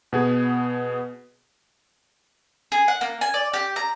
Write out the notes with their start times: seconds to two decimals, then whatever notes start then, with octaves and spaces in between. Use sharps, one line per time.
0.13 B2 B3 G#4
2.72 G#4
2.88 F#5
3.01 A#3
3.21 G#5
3.34 D5
3.54 G4
3.76 A#5